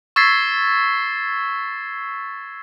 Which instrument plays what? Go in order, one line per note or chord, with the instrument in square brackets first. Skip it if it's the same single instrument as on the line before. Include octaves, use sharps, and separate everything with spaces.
[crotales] C#6 E6 G#6 A6 B6 C7